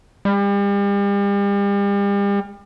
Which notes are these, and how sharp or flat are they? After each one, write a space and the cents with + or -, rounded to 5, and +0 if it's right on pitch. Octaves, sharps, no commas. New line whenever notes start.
G3 +40